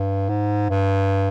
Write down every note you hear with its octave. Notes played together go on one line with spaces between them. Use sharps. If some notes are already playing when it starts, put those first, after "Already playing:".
Already playing: G2
G#2
G2